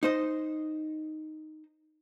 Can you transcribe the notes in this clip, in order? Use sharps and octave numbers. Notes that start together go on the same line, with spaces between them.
D#4 C5 D#5